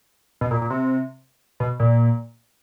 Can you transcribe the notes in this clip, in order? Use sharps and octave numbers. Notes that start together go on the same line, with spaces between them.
B2
A#2
A#2
C3
B2
A#2